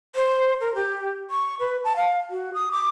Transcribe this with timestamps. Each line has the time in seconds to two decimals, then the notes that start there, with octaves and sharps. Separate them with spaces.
0.16 C5
0.61 A#4
0.75 G4
1.30 C#6
1.60 B4
1.84 A5
1.96 F5
2.30 F#4
2.54 D#6
2.72 D6